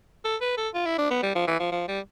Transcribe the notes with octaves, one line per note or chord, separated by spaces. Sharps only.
A4
B4
A4
F4
E4
D4
B3
G3
F3
E3
F3
F3
G3